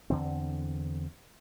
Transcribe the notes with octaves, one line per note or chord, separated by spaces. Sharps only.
E2 D3 C4